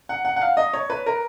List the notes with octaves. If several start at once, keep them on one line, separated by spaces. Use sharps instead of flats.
F#5
F#5
F#5
F5
D#5
C#5
B4
A#4